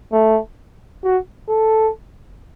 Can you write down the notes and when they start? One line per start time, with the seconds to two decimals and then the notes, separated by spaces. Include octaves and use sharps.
0.12 A3
1.04 F#4
1.49 A4